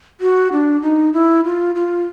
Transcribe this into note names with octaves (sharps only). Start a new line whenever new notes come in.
F#4
D4
D#4
E4
F4
F4